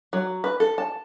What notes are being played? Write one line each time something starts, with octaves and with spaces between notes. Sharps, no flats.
F#3
B4
A4
A5